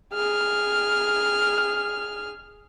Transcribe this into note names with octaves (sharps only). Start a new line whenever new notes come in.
G#4 F6